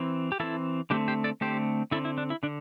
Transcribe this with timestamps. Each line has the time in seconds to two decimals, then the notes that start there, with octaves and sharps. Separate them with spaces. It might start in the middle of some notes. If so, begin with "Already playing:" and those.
Already playing: E3 C4
0.32 G4
0.40 E3 C4 E4 A4
0.90 D3 A3 C4 D4 G4
1.08 G4 C5
1.24 A4 D5
1.41 D3 A3 C4 G4 C5
1.91 D3 C4 E4 A4
2.05 E4
2.18 D4
2.30 E4
2.43 D3 D4